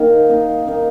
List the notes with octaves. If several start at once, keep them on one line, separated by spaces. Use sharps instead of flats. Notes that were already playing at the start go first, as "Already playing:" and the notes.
Already playing: D#3 A#3 D#4
D#3 A#3 D#4
D#3 A#3 D#4